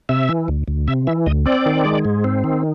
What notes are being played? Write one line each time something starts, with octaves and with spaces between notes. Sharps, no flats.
C3 E5
E3
D2
D2
C3 E5
E3 E5
D2 D#5
C4 D5
D#3
G#3
G#2
C4
D#3